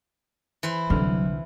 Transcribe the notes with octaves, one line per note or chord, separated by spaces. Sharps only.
E3 E4 C5
C2 D3 F#3 F6